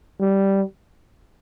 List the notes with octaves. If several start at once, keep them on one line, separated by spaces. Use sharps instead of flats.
G3